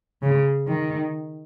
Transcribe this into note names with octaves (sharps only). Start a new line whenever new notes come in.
C#3
D#3